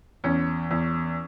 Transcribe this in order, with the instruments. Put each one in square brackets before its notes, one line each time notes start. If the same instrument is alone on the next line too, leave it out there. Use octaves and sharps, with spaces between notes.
[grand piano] E2 C#4
E2